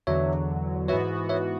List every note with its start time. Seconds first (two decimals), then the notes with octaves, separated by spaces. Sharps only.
0.07 E2 D3 F#3 C#5 E5
0.88 G#2 E3 B3 F#4 C#5 E5
1.29 C#5 E5